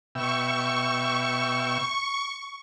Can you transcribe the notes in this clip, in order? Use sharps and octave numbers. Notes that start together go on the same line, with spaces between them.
B2 E5 G5 C#6